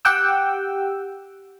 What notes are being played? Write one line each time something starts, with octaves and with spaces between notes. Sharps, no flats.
G4 F#5 G5 E6